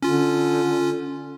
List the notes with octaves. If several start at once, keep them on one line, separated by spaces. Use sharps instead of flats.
D3 C#4 F4